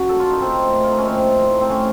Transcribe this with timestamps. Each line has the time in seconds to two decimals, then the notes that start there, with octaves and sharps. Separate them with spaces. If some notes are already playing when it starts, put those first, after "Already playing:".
Already playing: F#2 C#3 F#3 C#4 F#4
0.09 A#2 A4
0.19 F4
0.25 A#2
0.30 D#4
0.41 A#2 C4
0.57 A3
0.73 A#2
0.84 F4
0.89 A3 D#4
0.98 C#4
1.05 F3 C4
1.21 A#2
1.38 A2
1.54 A3
1.61 C4
1.70 A3 C#4